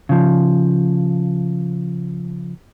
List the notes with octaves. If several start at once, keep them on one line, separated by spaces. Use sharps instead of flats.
C#3 F3